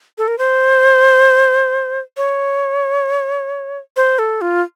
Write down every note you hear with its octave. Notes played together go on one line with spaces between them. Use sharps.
A4
A#4
C5
C#5
C5
A4
F4